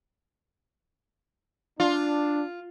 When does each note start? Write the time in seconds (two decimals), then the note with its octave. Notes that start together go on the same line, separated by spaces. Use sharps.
1.80 D4 F4